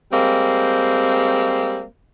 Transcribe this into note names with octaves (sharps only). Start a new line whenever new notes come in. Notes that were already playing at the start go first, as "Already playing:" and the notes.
G3 G#3 A#3 C4